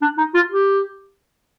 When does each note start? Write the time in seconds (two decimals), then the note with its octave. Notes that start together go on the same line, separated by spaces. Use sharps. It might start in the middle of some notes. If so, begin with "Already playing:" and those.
0.02 D4
0.18 D#4
0.34 F4
0.51 G4